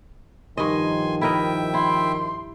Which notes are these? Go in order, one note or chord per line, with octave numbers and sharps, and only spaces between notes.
G2 D#3 F3 D#5 G#5 C6
E4 A#4 D#5 E5 G5
E4 C6